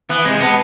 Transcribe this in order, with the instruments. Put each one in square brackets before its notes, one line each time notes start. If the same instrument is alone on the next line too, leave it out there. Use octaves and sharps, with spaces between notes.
[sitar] E3 [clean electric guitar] B3
[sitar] C3 [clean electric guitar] G#3
[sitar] B2 [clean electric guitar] B3